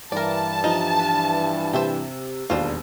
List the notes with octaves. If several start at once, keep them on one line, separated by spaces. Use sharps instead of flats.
G2 E3 A#4 D5 A5
F3 D#4
B4
C3 C5 E5 G5
E1 D#2 D4 F4 C5